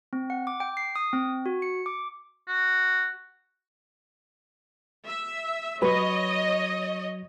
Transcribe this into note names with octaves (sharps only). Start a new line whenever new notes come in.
C4
F#5
D6
G5
C7
D#6
C4
F#4
C#7
D6
F#4
E5
F#3 B4 C#5 D#5 C#6